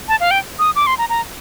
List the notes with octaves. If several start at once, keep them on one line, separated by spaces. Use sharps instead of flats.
A5
F5
G5
D#6
D6
C6
A#5
A#5